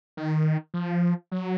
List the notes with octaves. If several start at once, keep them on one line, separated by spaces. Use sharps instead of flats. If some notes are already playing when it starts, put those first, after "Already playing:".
D#3
F3
F#3